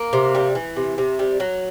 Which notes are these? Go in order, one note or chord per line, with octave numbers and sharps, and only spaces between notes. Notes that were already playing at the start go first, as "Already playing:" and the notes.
Already playing: A#3
C3
G3
E3
C3
C3
G3
F#3